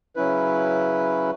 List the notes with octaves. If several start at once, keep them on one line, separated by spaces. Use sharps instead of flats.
C#3 F#3 C#4 E4 B4